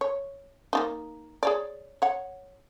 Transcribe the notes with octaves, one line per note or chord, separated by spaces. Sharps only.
C#5
A#3 D4 D#4
G#4 C#5 D5
C#5 F#5